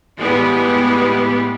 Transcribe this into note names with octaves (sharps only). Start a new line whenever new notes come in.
A2 E3 G3 G#3 B3 G4